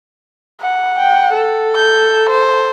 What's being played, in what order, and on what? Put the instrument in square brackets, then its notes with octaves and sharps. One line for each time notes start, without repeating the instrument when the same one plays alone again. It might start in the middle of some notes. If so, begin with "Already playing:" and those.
[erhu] F#5
[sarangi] G5
A4
[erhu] G6
C5